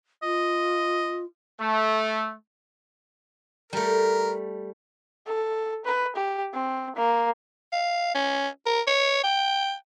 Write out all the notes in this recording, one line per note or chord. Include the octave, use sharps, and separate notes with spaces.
F4 D#5
A3
G3 A3 A#4
A4
B4
G4
C4
A#3
F5
C#4
A#4
C#5
G5